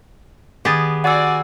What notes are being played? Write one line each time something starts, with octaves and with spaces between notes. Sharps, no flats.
D#3 B3 G4 G#4 A6
F#4 D5 F#5 G#5 E6